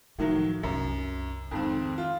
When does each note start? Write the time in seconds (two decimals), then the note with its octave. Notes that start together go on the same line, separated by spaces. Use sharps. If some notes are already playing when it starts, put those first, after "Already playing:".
0.19 A2 D#3 F3 F#3
0.63 C2 F#2
1.51 F2 G#2 D#3 C4
1.98 F4